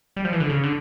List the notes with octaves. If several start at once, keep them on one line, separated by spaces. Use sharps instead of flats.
G3
F3
E3
D3
C#3
D3